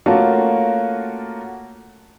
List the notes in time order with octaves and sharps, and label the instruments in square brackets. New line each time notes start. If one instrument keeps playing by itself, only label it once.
[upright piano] A3 A#3 C#4 F4 F#4 A5